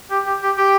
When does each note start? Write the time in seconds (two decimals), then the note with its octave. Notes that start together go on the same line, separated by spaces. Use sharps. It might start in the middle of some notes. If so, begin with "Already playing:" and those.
0.10 G4
0.26 G4
0.42 G4
0.57 G4